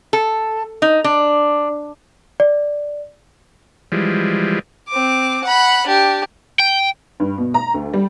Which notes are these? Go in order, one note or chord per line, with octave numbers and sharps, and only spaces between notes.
A4
D#4
D4
D5
E3 F3 G3 G#3
C4 D6
F#5 B5
D4 G4
G5
G2
B2
A#5
D2
G3